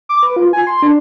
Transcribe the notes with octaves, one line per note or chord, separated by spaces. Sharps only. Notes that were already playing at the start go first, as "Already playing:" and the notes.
D6
B4
F4
G#5
C6
D4